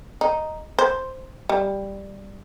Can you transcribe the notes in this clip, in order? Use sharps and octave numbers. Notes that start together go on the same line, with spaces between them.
D#4
C5
G3